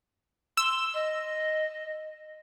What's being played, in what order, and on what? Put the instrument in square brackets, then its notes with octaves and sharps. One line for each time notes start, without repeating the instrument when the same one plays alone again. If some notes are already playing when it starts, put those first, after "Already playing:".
[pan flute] C6 [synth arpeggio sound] E6
[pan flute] D#5